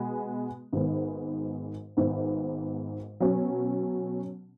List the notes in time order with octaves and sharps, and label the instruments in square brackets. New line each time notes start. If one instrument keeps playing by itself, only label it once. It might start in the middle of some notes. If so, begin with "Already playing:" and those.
Already playing: [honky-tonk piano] B2 G#3 B3
G#1 G#2 D#3 G#3 B3
G#1 G#2 D#3 B3
B2 F#3 C#4